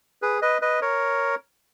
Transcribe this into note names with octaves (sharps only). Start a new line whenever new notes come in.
G#4 B4
B4 D#5
B4 D#5
A#4 C#5